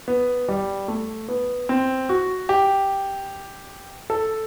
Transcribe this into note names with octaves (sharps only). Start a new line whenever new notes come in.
B3
G3
A3
B3
C4
F#4
G4
A4